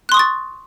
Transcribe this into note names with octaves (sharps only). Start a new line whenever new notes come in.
C6 C#6 D#6 F#6 A6